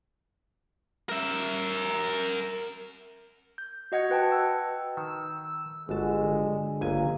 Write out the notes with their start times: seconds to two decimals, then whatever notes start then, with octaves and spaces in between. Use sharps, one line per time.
1.09 A#4 E5
3.58 G6
3.92 F#4 D#5 F#5 G#6 C#7
4.10 F#4 B4 G5 A5
4.31 A5 E6
4.97 D#3 E6
5.44 E6
5.89 G1 G#3 F#4 A5
6.22 D3
6.81 G1 C#2 A#3 G#5